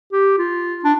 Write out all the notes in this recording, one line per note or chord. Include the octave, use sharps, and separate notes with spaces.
G4
F4
D4